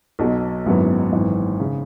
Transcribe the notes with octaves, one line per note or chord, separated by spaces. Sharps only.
B1 B2 F#3
G#1 F#2 F#3 B3 E4
G#1 F#2 E3
C#3